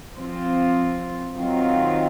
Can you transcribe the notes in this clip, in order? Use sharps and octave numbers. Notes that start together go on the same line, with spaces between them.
F3 C4 F4
D#3 F#3 C4 F4